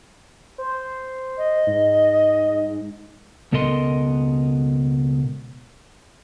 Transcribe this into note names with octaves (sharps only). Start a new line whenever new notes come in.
C5
D#5
G#2
C#2 B2 A4 A#4 D#5 C6